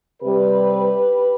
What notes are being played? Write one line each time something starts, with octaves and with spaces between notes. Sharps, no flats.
C3 G3 C4 G4 B4